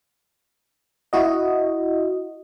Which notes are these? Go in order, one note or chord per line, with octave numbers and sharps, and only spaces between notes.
E4 F#4 D#5